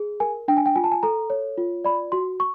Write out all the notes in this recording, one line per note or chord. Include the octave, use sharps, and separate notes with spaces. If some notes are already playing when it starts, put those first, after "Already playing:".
Already playing: G#4
A#4 G#5
D4 G5
G#5
G5
F4 G#5
A5
G#5
A4 A#5
C#5
F4
D5 B5
F#4 C6
C#6